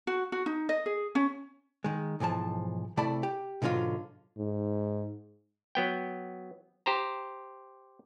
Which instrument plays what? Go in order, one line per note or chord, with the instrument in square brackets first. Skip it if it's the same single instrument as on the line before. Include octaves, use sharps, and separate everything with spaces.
[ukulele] F#4
F#4
D#4
D#5
G#4
C#4
[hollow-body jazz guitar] D#3 G#3
B1 G#2 E3 F3 A5
C3 A3 E4 D5 A5 B5
G4
G#2 B2 D3 F#3 F4
[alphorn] G#2
[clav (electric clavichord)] F#3 B3 G5
G4 C5 A#5